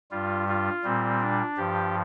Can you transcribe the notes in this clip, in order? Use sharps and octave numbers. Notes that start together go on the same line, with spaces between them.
G2 G3 F4
F4
A#2 G3 C4
D4
G2 F3 G4